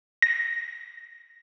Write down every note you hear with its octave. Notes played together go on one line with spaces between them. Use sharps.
A#6